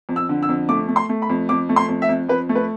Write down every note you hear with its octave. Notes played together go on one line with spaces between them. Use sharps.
F2
E6
D3
E6
F2
A3 D6
A3
C6
A3
B5
F2
F2 D6
A3
C6
F2
E5
F2
F2 B4
A3
B4